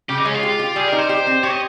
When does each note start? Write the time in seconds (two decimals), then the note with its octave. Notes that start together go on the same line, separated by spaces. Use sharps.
0.09 C#3 G4
0.18 D#4
0.25 G#3 C#4
0.34 F4
0.43 G4
0.59 G4
0.76 G3 G#4
0.88 D#4 A#4
0.98 C5
1.09 G4
1.27 C4
1.43 G4 C#5
1.52 D#5